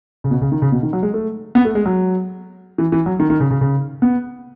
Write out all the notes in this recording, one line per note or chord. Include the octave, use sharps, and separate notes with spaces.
C#3
B2
C#3
D#3
C#3
B2
D#3
F#3
G#3
A3
B3
A3
G#3
F#3
E3
E3
F#3
D#3
D#3
C#3
C#3
C#3
B3